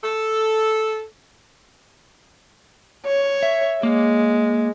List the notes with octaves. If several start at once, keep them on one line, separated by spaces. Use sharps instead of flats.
A4
C#5
E5
G#3 A#3